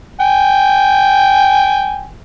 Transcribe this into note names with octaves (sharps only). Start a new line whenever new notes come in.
G5 G#5